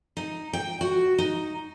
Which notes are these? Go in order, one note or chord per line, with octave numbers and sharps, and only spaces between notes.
D#4
G5
F#4
D#4